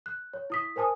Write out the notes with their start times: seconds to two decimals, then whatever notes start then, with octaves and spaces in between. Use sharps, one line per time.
0.06 F#6
0.34 C#5
0.50 E4 D#6 B6
0.76 A#4 C5 G#5 A5 D#6